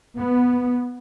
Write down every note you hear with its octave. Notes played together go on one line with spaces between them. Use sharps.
B3